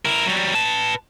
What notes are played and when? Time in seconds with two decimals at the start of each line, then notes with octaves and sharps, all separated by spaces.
0.05 E4 A#4
0.26 F#3 G3
0.55 B4 A5